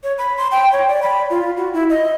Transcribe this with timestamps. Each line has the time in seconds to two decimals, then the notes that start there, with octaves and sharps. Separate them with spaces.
0.04 C#5
0.18 B5
0.37 C6
0.51 G5
0.73 C#5
0.88 D5
1.02 B5
1.30 F4
1.57 F#4
1.73 E4
1.90 D#5